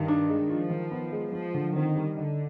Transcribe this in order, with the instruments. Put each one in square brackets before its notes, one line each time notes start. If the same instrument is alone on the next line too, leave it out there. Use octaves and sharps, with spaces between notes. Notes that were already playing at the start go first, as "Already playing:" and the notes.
Already playing: [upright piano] G2 [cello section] D#3
[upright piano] D4
G#3
[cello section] F3 [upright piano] F4
[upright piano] D#3
B3
G#3
[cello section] F3 [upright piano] F4
[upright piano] D3
[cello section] D#3 [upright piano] C4
[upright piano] G3
[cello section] D3 [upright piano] D#4